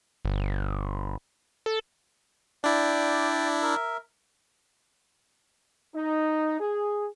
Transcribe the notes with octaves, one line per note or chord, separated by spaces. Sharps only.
G1
A4
D4 E4 D5 G5
A#4 E5
D#4
G#4